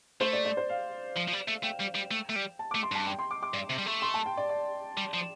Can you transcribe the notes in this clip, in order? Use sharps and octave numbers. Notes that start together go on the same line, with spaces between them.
A3 C5
D5
D5
C5
F5
F3
F3
G3
A3
A3 G5
G3
G3
A3
A3
G3
A5
D6
A3
C6
G2 A5
G5
C6
D6
D6
G2
C3
G3
A3
C6
A5
G5
D5
D5
G3
F3